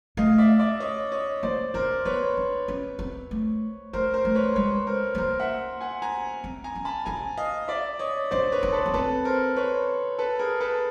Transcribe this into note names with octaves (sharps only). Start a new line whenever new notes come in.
A3 D#5 F5
D5 E5
D5 E5
C#5 D#5
C#5 D#5
A#3 C5 D5
D#4 A#4 C5
B3 B4 C#5
D4
C#4
C4
A3
A3 A#4 C5
A#4 C5
A3
B4 C#5
G#3 B4 C#5
A#4 C5
A3
A#3 A#4 C5
E5 F#5
F#5 G#5
G#5 A#5
C4
G#5 A#5
C#4
A5 B5
D#4 G#5 A#5
D#5 F5
D5 E5
C#5 D#5
D4 C5 D5
B4 C#5
D4
A4 B4
B3
C4 A4 B4
A#4 C5
B4 C#5
A4 B4
G#4 A#4
A4 B4